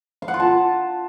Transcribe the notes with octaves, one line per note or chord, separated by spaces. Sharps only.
F5
F#5
F4
A5